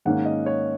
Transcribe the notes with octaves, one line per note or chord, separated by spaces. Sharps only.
G#2 D#3 A#3 C#4 F#5
D#5
C#5